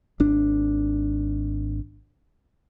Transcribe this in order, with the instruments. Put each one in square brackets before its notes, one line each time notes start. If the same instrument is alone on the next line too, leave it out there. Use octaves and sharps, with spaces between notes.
[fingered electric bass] G#1 D4